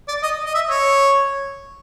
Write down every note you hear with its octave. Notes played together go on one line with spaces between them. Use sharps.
D5
D#5
D#5
E5
C#5